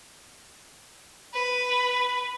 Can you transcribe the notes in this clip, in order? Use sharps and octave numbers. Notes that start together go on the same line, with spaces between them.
B4